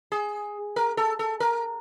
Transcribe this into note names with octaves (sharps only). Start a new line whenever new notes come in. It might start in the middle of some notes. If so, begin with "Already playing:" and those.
G#4
A#4
A4
A4
A#4